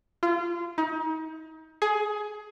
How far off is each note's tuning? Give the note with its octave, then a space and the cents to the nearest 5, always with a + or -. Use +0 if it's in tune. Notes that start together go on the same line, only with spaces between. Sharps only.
F4 -25
D#4 +35
G#4 +20